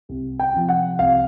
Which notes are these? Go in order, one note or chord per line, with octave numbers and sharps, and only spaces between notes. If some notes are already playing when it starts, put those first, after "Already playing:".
C2
G5
C3 F3
F#5
C2 F5